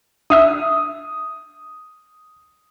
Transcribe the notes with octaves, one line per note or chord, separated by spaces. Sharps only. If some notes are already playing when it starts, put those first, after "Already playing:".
D4 E5 D#6 E6